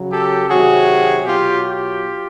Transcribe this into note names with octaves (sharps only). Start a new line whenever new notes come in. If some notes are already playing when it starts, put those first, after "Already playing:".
Already playing: C#3 F#3
G4 A4
C3 D#3 F#3 F#4 G#4
B2 F#3 F4 G4
F4 G4